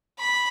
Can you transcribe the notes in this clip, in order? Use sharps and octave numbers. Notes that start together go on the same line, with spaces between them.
B5